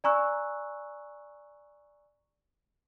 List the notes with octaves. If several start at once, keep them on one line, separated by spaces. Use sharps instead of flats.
D5 G#5 A#5 C#6 E6 F#6